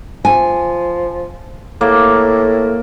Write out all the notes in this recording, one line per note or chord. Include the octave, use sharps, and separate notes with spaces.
F3 G#5
A2 A#3